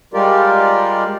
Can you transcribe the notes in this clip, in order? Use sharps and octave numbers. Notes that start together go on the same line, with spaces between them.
G3 G#3 F4 G4 A#4 D5